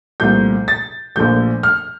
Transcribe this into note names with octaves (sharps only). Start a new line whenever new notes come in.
C2 A#2 F3 A3 G6
A6
A#1 A#2 F3 A3 G6
F6